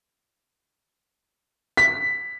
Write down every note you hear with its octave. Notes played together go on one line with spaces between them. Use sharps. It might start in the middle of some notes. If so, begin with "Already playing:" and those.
B6